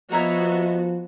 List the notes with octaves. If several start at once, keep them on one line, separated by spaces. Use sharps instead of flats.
F3 B3 F#4 C#5 D#5 E5 A#5